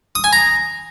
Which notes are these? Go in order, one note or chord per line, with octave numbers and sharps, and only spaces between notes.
D#6
G#5
A#5